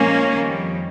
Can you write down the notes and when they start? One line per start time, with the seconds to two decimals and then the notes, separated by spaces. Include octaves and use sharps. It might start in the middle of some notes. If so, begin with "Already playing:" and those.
Already playing: A#2 F3 G#3 A#3 C#4
0.32 F2 D#3 G3